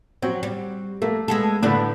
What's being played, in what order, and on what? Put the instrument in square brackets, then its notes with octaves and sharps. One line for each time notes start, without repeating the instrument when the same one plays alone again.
[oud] F#3 [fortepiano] C4 F#4
[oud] G3
[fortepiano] A3 [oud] A#3
[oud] G#3 B3 A4
[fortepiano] A2 D3 B3 [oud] G3 D4 B4